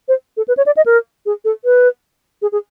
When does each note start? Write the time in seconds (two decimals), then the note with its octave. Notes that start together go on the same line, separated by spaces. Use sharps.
0.08 C5
0.37 A4
0.48 B4
0.57 C#5
0.66 D5
0.77 D#5
0.86 A#4
1.26 G#4
1.45 A4
1.65 B4
2.42 G#4
2.52 G#4